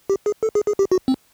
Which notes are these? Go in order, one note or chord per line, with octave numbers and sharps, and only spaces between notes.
G4
G#4
A4
G#4
G#4
G4
F#4
C4